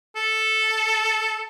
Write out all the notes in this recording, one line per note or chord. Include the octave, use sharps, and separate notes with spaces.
A4